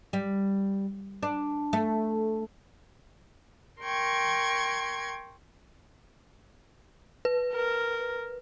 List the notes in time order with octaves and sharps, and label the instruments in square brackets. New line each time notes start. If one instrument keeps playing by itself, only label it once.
[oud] G3
D4
A3
[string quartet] A#4 G5 C6 C#6 G#6
[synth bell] B4
[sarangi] A#4